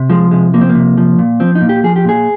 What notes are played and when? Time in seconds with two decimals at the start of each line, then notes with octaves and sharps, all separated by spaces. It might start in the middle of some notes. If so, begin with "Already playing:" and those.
Already playing: C3
0.10 F3 G#3
0.31 C3 G#3
0.54 F3 A#3
0.61 C4
0.69 A#3
0.75 C3
0.98 F3
1.19 A#2
1.40 F3 C4
1.55 D#4
1.61 A#2
1.69 G4
1.84 F3 G#4
1.96 G4
2.05 A#2 G#4